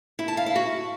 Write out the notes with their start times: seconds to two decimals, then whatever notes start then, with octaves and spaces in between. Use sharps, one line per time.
0.19 E4
0.28 A5
0.37 F5
0.46 E4
0.56 F#4